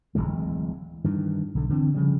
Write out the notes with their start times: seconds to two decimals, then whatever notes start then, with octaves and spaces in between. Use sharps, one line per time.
0.15 D1 F2 E3 G#3
1.04 G2 D#3 E3
1.55 B1 D3
1.69 D3 E3 G3 C4
1.95 C#3 F3 G3